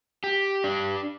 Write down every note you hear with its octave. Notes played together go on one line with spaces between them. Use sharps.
G4
D4